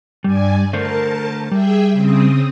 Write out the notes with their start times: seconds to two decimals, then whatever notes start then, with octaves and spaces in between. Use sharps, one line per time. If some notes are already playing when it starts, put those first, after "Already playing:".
0.24 G2 G3 D5 G#5
0.73 D3 A3 A#4 C5 A5
1.52 G3 G#4 E5 G5
1.92 C#3 C4 D#6